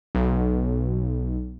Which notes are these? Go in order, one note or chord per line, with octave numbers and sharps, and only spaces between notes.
B1